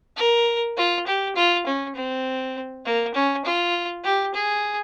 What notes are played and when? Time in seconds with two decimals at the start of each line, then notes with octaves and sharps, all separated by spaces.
0.16 A#4
0.77 F4
1.06 G4
1.36 F4
1.66 C#4
1.95 C4
2.85 A#3
3.14 C#4
3.45 F4
4.04 G4
4.34 G#4